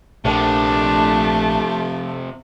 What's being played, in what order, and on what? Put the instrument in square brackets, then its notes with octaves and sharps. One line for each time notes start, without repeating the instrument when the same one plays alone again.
[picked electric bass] A#1 [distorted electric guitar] C3 F3 [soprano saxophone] A3 [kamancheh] D4